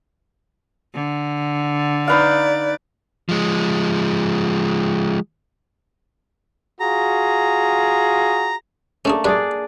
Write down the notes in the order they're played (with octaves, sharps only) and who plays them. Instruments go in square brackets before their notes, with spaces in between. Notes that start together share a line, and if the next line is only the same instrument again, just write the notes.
[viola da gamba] D3
[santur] D#4 B4 F5 [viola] D5
[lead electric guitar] F3 G#3
[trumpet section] F4 F#4 G#4 [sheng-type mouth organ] A#5
[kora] A3 A#3 [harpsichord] C#4 D4 G#4
[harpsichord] F#2 G3 [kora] D4 G#4 D5